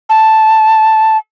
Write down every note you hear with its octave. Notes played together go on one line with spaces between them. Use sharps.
A5